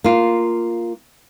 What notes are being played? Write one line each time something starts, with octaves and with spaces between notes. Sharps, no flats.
A#3 F4